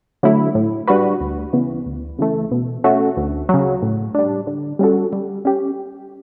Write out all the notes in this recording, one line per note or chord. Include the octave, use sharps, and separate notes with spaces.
D3 F#3 A3 E4
A2
G3 D4 F#4 B4
D2
C#3 E3 B3
D2
C#3 E3 A3
B2
A3 C#4 F#4
D2
C#3 F#3
A2
G3 D4
D3
G3 C#4 F#4 A4
G3
C#4 G4